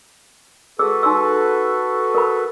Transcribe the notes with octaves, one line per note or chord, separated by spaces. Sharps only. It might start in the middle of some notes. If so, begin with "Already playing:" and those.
F#4 G#4 A4 B4 E6
D#4 C6 E6
A#4 B5